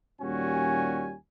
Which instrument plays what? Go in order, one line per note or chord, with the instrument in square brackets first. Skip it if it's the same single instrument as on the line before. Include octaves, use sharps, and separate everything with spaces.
[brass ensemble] D#2 A#2 G3 C#4 F#4 G#5